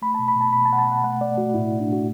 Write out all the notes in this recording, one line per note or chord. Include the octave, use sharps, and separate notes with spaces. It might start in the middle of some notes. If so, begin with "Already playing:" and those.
A3 B5
A5
B2
B5
B2
A5
B2 B5
A5
B2 F#5
A5
B2
F#5
A3 F#5
A3 D5
A3 F#4
A2 E4
A2
D4
A3 F#4